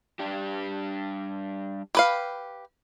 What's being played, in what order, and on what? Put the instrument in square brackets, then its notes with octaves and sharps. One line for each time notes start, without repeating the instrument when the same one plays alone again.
[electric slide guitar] G3 D4 G4
[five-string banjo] G4 B4 F5